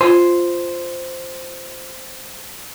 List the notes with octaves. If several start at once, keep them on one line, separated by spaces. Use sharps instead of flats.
F4 C5 G#5 C6